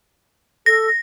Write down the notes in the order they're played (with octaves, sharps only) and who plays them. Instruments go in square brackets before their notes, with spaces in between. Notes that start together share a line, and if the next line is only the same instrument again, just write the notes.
[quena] A4 [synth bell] A#6